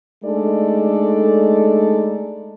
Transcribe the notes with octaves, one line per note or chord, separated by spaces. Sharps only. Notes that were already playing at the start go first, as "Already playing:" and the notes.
G#3 A3 D4 D#4 A4 D5